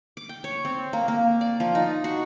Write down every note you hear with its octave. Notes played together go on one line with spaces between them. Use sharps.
D6
G5
C#5
C4
A#3
A#3
D5
F3
D#4
F#4